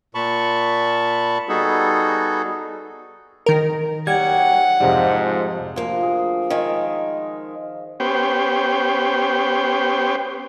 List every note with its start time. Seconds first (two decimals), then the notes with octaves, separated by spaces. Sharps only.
0.15 A#2 A5 B5 C#6
1.49 G3 B3 D#4 F#4 G#4 A4
3.46 D#3 A#4
4.07 D#2 F#3 G3 F#5 G5 G#6
4.80 F2 G#2 C3 F3 G3
5.76 D2 F3 A#3 C6
6.02 G#4
6.50 D#3 G#3 F5
8.00 B3 C#4 G4 C5 G5